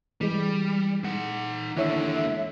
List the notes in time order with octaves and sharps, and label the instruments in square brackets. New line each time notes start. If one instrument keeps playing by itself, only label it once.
[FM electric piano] E3 G#3 [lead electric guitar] G3
[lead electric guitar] D#4 F#5
[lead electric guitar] D#2 D3 [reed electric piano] D#3 E4 C#5 [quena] E5